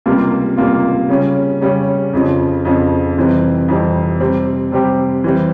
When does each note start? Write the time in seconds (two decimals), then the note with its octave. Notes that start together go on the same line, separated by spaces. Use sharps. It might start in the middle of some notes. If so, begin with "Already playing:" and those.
0.06 C#2 C3 G3 A#3 F4
0.57 C#2 C3 G3 A#3 F4
1.09 C#3 G3 C#4
1.61 C#3 G3 C#4
2.13 F2 C#3 F3
2.65 F2 C#3 F3
3.17 F2 C3 E3 G3 C4
3.68 F2 C3 E3 G3 C4
4.20 C3 G3 C4 G4
4.72 C3 G3 C4 G4
5.24 E3 G3 C4